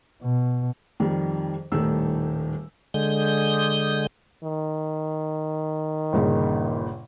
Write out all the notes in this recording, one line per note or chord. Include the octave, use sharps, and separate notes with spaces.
B2
F2 D#3 G3
D#1 A2 D#3 G3 A3 E6
D3 G#3 D#6 G6
D#3
G1 A#2 C#3